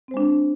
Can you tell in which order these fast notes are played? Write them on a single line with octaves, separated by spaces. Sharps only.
C4 C5 G#3 D4